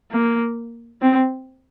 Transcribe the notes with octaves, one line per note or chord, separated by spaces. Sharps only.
A#3
C4